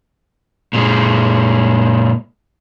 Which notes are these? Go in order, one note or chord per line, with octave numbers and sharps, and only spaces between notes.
A#2 G#3